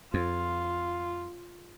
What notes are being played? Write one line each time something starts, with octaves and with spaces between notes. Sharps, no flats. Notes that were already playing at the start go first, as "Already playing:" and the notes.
F2 F4